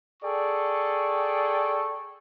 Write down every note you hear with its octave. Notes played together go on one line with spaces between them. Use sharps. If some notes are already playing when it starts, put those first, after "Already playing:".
G#4 A4 D5 G5 C#6